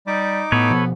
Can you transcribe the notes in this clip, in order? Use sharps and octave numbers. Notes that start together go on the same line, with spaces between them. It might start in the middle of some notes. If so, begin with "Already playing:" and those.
G3 D#4 D6
A2 B3 A4 B4 C#5
B2 F3